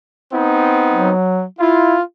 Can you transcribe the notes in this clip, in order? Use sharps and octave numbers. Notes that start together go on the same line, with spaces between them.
B3 C4 D#4
F#3
E4 F4